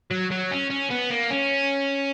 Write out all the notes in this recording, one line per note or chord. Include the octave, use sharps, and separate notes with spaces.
F#3
F#3
C#4
C#4
B3
A#3
C#4